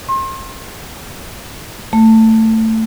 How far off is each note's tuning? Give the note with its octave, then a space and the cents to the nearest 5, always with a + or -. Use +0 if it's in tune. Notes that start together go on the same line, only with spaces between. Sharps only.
C6 +35
A3 +15